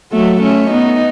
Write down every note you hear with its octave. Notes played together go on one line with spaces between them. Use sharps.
F#3 A3
A3 C#4
B3 D#4